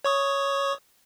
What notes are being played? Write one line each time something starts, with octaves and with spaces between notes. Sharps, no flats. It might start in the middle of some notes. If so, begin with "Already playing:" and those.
C#5 C#6 D#6